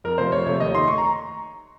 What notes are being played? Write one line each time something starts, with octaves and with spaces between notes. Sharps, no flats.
F2 A#4
C3 F3 A3 C5
F2 C#5
C3 F3 A3 C#5
D#2 D#5
D#3 A3 C6
C#6
A#5